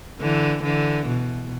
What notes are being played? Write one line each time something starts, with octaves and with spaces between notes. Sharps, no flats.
D3 E3
D3 E3
B2